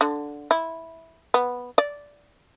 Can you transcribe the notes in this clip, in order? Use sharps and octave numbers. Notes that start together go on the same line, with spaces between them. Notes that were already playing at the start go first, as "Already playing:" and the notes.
D3
E4
B3
D5